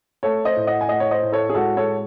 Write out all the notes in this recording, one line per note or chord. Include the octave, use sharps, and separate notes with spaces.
A3 A4 C#5
C5 D#5
A2
D#5 F#5
G#5
A3 D#5 F#5
C#5
C5 D#5
A2
A4 C#5
G#4
G#3 F#4 A4
A4 C#5